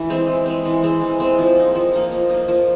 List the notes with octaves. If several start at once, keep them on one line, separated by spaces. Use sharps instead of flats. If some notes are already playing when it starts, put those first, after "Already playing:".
Already playing: E3
G#3 C4
E3
G#3 C4
E3
G#3 C4
E3
G#3 C4
F3
A#3 D#4
F3
A#3 D#4
F3
A#3 D#4
F3